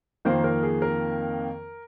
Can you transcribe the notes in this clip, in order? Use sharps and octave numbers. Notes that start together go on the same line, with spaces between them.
F2 D#3 A#3 C5
A#4
G#4
A#4